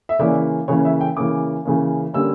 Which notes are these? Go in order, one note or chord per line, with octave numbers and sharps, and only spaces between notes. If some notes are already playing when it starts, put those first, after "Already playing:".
E5
C#3 E3 A#3 C#4 D5
C#3 E3 A#3 C#4 C#5
E5
G5
C#3 E3 A#3 C#4 D6
C#3 E3 A#3 C#4
D3 G3 A#3 C#4 E6